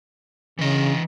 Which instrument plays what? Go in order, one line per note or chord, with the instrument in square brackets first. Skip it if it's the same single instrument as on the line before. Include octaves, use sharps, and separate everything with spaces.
[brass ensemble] C#3 [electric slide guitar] E3 D#5